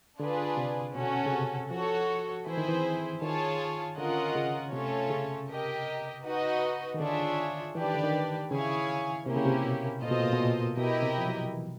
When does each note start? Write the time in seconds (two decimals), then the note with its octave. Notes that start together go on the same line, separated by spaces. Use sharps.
0.20 D3 D4 F4 G#4 B4 D5
0.57 C3
0.95 B2 C#4 F#4 A4
1.26 C#3
1.33 C3
1.71 F3 F#4 A4 C#5
2.46 E3 C4 E4 G#4 C5
2.58 D#3
2.69 E3
3.22 D#3 F4 G#4 C#5 F5 A5
3.97 D3 C#4 F4 A#4 D#5 F#5
4.35 C#3
4.72 C3 A3 C#4 F4 A4 C#5
5.11 C#3
5.49 G4 A#4 D#5
6.25 D#4 F#4 B4 D#5
6.94 D#3
7.00 D3 D4 F4 G#4 C#5 E5
7.75 E3 D4 G4 B4 D5
7.84 D#3
7.95 D3
8.04 D#3
8.50 C#3 E4 G#4 C#5 F5 G#5
9.26 C3 A#3 C#4 E4 G4
9.36 C#3
9.46 C3
9.64 B2
10.02 A#2 F4 A4 C5 D#5
10.11 B2
10.20 A#2
10.33 B2
10.40 A#2
10.77 B2 E4 G4 A#4 D#5 G5
11.03 C3
11.18 F3
11.27 F#3
11.53 E3